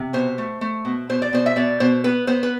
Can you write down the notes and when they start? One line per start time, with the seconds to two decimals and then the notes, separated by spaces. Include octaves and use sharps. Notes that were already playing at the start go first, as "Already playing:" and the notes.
Already playing: C3
0.13 B2 C5
0.38 A3
0.61 A3
0.85 B2
1.09 B2 C5
1.22 D5
1.33 B2 C5
1.46 E5
1.56 B2 D5
1.80 B2 C5
2.04 B3 B4
2.27 B3 C5
2.43 B4